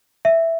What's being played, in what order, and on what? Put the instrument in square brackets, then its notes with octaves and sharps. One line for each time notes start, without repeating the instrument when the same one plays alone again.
[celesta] E5